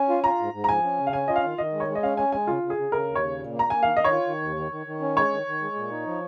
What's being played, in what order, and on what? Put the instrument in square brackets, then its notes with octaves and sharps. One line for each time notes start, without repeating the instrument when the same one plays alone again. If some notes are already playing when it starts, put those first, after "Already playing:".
Already playing: [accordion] C#4 [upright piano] G#5
[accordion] F4
[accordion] F4 [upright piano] A#5
[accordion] G#2
G#2
[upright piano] A#5
[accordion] F3 [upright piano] G#5
[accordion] C#4
C#3
[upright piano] F5
[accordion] C#4 [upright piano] G#5
[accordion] F4 [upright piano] D#5
[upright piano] F5
[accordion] D#3
[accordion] D#3 [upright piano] D#5
[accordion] G#3
[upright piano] C#5
[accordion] G#3
[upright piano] D#5
[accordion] C#4 [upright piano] F5
[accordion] C#4 [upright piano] G#5
[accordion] G#3 [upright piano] G#5
[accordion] C#3 [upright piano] F4
[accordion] C#3
[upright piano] G#4
[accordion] C#3
[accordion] C#3 [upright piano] A#4
[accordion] D#2
[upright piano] C#5
[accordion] C#3
A#2
A#3
[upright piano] A#5
[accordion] A#3 [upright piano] G#5
[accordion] D#3 [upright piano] F5
[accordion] D#3 [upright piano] D#5
[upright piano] C#5
[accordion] F4
D#3
D#2
D#3
D#3
D#3
C#4
[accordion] G#3 [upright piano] C#5
[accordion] D#3
D#3
G#3
A#2
D#4
F3